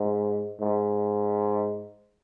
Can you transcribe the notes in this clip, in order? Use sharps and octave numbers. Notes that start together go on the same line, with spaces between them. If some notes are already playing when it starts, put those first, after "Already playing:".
Already playing: G#2
G#2